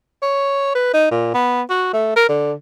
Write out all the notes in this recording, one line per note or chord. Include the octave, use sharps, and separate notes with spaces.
C#5
B4
D#4
A#2
B3
F#4
A3
A#4
D3